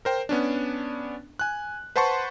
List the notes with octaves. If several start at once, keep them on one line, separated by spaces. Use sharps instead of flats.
A#4 C5 G5
B3 C#4 D4
G#5 F#6
B4 C5 F#5 A5 C6 C#6